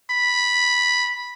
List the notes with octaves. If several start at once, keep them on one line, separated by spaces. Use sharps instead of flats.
B5